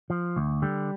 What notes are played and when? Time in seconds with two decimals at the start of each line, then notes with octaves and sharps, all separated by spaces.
0.10 F3
0.36 D2
0.62 D3 G3